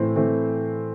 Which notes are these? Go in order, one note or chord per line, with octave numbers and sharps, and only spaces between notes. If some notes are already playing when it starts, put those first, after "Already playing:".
Already playing: A2 E3 A3 C4 C5
A2 E3 A3 C4